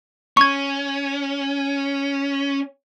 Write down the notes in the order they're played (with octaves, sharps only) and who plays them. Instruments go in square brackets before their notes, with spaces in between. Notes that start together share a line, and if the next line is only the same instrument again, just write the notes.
[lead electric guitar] C#4 [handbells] C#6 G#6